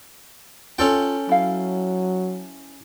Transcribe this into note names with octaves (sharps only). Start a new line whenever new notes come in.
C#4 F4 A4 G5
F#3 E4 F5